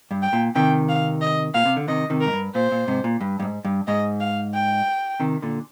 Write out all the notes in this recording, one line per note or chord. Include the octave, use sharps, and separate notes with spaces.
G2
G5
A#2
C3 D#3 G5
F5
D#5
A#2 F5
C3
D3
C3 D#3 D#5
C3 D#3
A#4
G#2
G2
A#2 C5
A#2
G#2 C3
A#2
G2
G2
G#2
G2
G#2 D#5
F5
G5
C3 D#3
A#2 D3